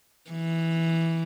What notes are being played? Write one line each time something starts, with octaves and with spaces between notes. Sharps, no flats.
E3